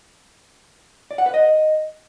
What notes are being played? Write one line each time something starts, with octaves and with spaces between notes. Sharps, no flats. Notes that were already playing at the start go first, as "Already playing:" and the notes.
D5
F#5
B4
D#5